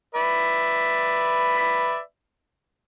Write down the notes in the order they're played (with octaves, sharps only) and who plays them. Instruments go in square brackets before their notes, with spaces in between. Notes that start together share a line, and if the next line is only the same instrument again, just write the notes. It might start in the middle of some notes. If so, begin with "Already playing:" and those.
[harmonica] B4 D5 E5